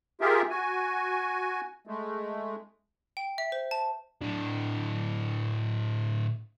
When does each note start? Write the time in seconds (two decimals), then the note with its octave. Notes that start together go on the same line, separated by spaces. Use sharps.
0.21 F4 G4 G#4 A#4 E5
0.50 F#4 G#5
1.87 G#3 A3
3.17 G5
3.38 E5
3.52 C5
3.71 A5
4.21 A2 D4